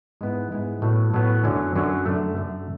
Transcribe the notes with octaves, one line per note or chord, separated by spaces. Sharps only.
G#2 G#3 B3 E4
G#2 G#3 B3 E4
A2 F#3 B3
A2 F#3 B3
F#2 D3 F#3 C#4
F#2 D3 F#3 C#4
F#2 D3 A3
F#2 D3 A3